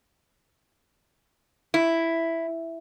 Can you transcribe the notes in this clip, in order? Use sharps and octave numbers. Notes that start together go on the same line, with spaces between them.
E4